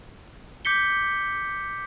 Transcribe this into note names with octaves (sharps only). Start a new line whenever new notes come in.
D6 G6 B6 C#7 G7